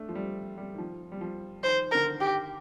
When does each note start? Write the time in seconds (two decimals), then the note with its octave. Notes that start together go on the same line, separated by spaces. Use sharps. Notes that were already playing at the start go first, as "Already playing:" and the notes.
Already playing: A3 D4
0.09 F3
0.15 G3
0.58 G3
0.74 D#3
0.78 F3
1.12 G3
1.21 F3
1.63 D#3 C5
1.91 D3 A#4
2.06 D#3
2.20 G4